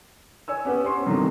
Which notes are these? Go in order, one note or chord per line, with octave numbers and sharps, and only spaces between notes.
C#5 G#5 E6
B3 C#4 G4 B4 F#5
C#4 C5 C6 C#6
G2 C3 D#3 F#3 A3